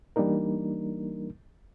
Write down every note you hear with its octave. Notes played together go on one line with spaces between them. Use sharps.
E3 G3 A#3 D4 D#4 A#4